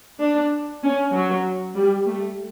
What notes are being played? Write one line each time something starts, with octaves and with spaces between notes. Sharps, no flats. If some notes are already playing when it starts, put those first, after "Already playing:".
D4
C#4
F#3
G3
A3